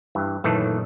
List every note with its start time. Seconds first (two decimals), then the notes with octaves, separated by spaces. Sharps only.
0.15 G2 E3
0.44 F#2 A#2 D#3 E3 A3 A4